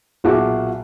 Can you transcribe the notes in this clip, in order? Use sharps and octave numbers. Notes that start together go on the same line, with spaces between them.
B1 A#2 F#4 G#4 E5 D6